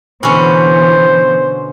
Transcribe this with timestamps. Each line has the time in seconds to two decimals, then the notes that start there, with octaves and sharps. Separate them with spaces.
0.23 B2 D3 E3 B3 C#4 C5